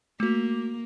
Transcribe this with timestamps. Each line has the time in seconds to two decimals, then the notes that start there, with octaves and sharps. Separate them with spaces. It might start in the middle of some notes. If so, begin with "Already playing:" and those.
0.20 A3 A#3 F#4